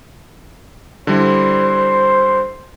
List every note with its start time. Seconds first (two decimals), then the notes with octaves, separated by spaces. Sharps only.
1.07 D3 G3 E4 C5